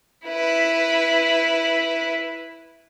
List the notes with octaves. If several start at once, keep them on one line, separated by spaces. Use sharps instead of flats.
E4 B4